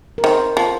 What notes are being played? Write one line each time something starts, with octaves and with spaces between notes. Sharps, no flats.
A#4
D#3 C5
F3 C5